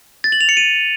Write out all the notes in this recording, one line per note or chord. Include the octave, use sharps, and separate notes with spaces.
A6
F#7
F7
C#7
D#7